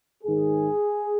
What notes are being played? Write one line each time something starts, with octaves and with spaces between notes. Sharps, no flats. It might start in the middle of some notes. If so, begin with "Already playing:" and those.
G#2 D#3 G#4